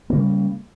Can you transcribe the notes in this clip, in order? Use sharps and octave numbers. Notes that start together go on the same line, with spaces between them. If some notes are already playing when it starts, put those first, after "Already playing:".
C#3 G3 A#3